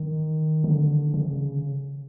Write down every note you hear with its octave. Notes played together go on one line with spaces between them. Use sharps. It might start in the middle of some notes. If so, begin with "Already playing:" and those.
Already playing: D#3
D3
C#3